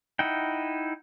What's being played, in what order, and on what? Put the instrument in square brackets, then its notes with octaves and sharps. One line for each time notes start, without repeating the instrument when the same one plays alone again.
[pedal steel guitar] D#4 E4 F#5 G5